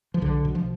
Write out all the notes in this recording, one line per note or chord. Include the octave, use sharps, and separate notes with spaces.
F3
B1 D3
B2
F3